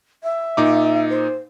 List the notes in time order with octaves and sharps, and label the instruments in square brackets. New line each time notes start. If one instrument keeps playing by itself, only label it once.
[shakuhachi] E5
[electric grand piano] A#2 D#4 D6
[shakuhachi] C5